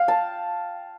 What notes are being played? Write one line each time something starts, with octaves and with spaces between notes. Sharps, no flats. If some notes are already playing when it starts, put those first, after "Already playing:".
Already playing: F5 G5
A5